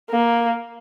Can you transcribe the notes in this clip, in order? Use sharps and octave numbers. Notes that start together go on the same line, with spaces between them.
A#3